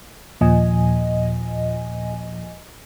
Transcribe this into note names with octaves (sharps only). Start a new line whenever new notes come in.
D#2 A#2 F3 D#5 G#5